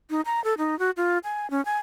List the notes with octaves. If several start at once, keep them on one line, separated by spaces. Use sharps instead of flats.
D#4
A#5
A4
D#4
F#4
F4
G#5
C#4
G#5